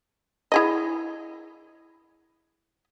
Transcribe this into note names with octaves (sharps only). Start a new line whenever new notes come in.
E4 G#4 D#5